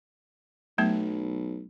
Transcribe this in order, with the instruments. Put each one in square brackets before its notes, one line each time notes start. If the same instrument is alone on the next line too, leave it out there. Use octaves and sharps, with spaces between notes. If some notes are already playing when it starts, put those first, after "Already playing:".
[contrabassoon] B1 [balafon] F#3 A3 B3